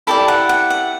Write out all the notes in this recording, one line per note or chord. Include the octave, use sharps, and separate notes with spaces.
E4 G4 A4 D5 A5
F#5
F#5
F#5